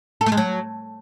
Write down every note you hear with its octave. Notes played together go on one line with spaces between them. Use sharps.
A4
A3
G#3
F#3